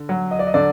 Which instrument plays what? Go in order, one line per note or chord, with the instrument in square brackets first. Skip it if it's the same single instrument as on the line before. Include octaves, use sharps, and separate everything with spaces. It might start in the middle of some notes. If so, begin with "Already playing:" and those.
Already playing: [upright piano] D3
F#3
[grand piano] D#5
D5
D#5
[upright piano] D3 [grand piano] D5